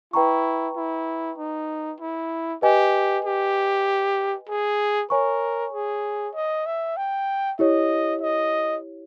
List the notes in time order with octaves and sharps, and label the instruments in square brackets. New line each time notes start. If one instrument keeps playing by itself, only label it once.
[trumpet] E4 [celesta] B4 G5 A#5 C#6
[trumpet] E4
D#4
E4
[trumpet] G4 [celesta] B4 D#5 G#5
[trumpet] G4
G#4
[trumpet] A#4 [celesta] C#5 G#5 C#6
[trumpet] G#4
D#5
E5
G5
[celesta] E4 G4 C#5 [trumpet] D#5
[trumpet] D#5